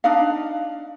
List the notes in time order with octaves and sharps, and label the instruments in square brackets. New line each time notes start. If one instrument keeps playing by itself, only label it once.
[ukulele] D4 D#4 F5